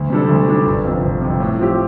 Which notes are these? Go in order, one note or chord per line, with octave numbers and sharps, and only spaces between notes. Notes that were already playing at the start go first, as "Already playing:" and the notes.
Already playing: D2
C3 G3 D4 A4
D2
C3 G3 D4 A4
G1
F2 C3
G1
F2 C3
A2
F3 C4 G4